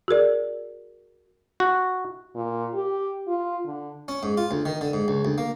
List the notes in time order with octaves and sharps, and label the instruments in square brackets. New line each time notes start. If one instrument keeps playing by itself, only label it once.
[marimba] F#4 G#4 A#4 D5
[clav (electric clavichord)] F#4
[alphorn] A#2
G4
F4
D3
[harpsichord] C#4
G#2
F4
D2
D#3
D3
G#2
C#2
D2
A#3